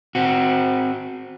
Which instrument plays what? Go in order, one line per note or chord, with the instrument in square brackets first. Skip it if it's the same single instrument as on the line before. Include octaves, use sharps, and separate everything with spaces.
[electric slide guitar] C4 F#4